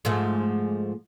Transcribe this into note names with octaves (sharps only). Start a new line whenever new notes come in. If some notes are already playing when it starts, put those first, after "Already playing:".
G#2 F3 A3